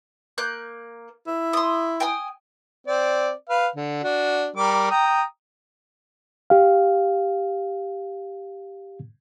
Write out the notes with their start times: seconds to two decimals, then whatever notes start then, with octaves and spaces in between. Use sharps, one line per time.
0.38 A#3 F#6 G6
1.27 E4
1.53 C6 D#6
2.00 G5 G#5 D#6
2.87 C4 D5
3.49 B4 F5
3.76 D3
4.03 D4 F#4
4.56 G3 A#4 D6
4.90 G5 A#5 D#6
6.50 G4 F5